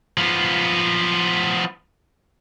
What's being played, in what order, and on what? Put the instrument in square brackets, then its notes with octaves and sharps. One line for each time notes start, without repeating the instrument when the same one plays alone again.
[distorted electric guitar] F3 B3